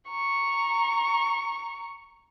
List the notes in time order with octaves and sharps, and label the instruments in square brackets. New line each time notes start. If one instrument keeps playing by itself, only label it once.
[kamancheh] A#5 C#6